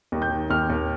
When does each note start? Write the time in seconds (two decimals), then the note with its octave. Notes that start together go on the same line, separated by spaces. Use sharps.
0.12 D#2
0.22 G6
0.30 D#3
0.50 D#2 F6
0.70 D#2